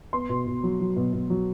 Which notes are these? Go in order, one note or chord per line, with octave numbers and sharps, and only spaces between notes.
B3 C6
B2
B2
F#3
F#3
B2
B2
F#3